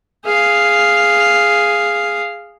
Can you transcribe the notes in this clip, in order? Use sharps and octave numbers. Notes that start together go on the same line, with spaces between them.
G#4 F5